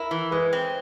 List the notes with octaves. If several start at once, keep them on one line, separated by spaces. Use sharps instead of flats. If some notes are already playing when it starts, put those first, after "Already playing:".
Already playing: E4 A#4
E3
G#3 B4
C4